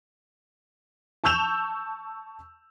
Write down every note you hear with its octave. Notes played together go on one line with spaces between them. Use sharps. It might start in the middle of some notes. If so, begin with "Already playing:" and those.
A5 C#6 E6 G6 E7 F7